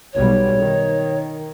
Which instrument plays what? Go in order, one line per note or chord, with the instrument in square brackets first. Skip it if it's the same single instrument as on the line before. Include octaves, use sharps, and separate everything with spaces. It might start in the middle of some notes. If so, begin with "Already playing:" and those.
[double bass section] B1 G3 [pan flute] C#5
[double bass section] D#3